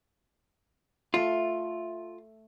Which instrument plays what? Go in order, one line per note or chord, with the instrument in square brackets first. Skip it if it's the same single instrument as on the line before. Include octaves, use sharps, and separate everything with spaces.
[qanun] A3 [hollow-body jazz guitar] F4